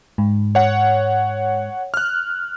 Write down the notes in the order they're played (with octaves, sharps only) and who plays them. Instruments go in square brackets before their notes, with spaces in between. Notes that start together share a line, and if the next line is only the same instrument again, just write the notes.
[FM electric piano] G#2
[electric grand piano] C#5 F#5
F6 F#6